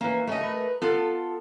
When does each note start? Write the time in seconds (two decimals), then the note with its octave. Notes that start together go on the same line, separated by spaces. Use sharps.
0.01 E3 A#3 C#4
0.27 A3 C#4 C#5 D#5
0.41 A#4 B4
0.82 B3 F4 A4